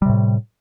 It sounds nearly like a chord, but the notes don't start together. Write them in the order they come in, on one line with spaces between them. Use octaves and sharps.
G3 C3 A2